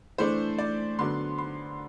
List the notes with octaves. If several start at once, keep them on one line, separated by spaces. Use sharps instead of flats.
E3 A3 D4 C5
D5
D3 F#3 B3 D4 C6
C6